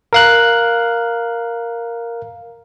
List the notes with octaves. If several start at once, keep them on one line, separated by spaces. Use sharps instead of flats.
A#4 F5 F#6